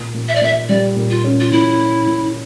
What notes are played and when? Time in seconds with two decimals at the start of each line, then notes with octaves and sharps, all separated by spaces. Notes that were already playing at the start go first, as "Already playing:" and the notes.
Already playing: A#2
0.14 A#2
0.28 E5
0.35 D5
0.41 A#2 E5
0.69 G3 D5
0.96 A#2
1.10 F4
1.24 C#4
1.40 F4
1.51 A#2 E4
1.79 A#2
2.07 A#2